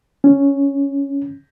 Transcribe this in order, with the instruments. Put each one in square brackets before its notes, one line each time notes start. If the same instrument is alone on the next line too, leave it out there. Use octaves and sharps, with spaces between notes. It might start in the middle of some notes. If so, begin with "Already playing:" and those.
[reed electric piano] C#4